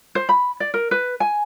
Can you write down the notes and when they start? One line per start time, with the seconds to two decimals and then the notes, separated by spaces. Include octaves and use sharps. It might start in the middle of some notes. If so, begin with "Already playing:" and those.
0.15 C5
0.29 B5
0.60 D5
0.74 A#4
0.91 B4
1.20 G#5